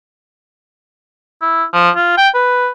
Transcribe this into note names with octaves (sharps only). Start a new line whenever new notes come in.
E4
F3
F4
G5
B4